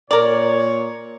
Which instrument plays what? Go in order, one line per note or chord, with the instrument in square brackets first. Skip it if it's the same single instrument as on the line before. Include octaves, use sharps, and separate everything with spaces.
[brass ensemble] A#2 C#5 [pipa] A#4 D5